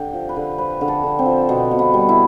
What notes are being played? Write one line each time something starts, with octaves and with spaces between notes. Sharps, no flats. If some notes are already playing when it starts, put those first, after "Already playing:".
Already playing: D3 G4
F3
B4
D3
F3 B4
D3
A4
D3
C4
F3
B2 B3
B2
B3
G3
E4